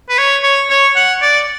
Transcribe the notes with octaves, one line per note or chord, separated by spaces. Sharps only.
B4
C#5
C#5
C#5
F#5
D5